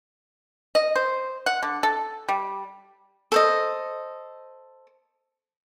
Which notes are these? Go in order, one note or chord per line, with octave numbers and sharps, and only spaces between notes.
D#5
C5
F#5
D3
A4
G3
A4 C5 D#5